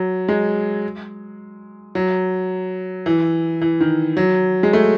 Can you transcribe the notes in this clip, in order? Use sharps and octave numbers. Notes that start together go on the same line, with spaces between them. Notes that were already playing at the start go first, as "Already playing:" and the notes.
Already playing: F#3
G#3
F#3
E3
E3
D#3
F#3
G#3
A3